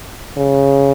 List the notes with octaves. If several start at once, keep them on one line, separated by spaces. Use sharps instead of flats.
C#3